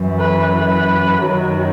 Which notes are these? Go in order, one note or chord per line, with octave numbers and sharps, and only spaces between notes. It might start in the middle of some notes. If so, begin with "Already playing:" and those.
Already playing: F#2 E3
B4
B4
F#2 D#3 F#3